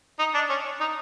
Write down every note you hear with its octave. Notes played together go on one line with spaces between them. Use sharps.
D#4
D4
C#4
D#4